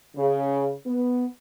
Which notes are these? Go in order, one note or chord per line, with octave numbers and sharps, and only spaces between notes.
C#3
B3